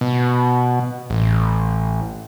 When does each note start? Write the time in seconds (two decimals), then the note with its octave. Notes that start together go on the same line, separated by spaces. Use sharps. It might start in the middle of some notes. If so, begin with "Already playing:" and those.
0.01 B2
1.10 A1